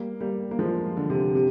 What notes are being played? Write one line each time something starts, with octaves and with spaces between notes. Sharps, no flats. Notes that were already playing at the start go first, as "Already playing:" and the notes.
Already playing: G3 A#3
G3 A#3
A#3
F3 G#3
D3
C3
C3